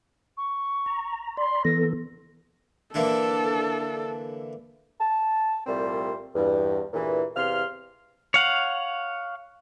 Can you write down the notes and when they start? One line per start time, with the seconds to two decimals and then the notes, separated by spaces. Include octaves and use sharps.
0.37 C#6
0.86 A#5
1.37 D5 B5 C6
1.65 E3 B3 A4 A#6
2.94 D3 E3 A#3 D4 A4
5.00 A5
5.66 C2 A#2 G3 A3 C4 C5
6.35 E2 G2
6.93 E2 G2 A#2 E3
7.35 E2 C3 F5 C6 F6
8.34 C#5 F5 F#5